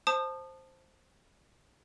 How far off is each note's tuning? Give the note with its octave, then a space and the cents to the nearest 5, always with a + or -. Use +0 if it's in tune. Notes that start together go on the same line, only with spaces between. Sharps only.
C5 +5 A5 +0 D#6 -30